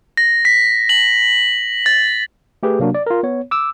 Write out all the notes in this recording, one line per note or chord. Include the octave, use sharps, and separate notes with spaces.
A#6
B6
F#7
A6
A3 G4 G#4 B4
C3 F#3 A#3 D4 F#4
D5
F4 A#4
B3 C#5
D6 E6